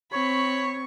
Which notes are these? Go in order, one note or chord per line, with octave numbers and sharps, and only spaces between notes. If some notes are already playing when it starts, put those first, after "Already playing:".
C4 C#5 B5 C#6